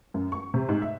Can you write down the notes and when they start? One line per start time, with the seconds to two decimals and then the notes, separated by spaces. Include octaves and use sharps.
0.14 F#2
0.32 C#6
0.54 C3
0.69 G#2
0.82 E5